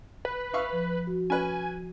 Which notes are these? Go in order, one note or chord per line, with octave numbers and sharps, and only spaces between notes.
B4
E5 F5 C#6
F3
F#4
C#4 B4 G#5